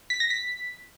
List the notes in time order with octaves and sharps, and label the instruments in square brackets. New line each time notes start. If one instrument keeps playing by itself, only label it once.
[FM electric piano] B6
A#6
B6